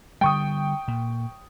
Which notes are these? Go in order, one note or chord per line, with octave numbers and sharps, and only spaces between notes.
D3 G3 G5 C#6 D#6
A#2